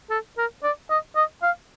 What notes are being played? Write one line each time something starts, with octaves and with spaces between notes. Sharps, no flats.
A4
A#4
D5
D#5
D#5
F5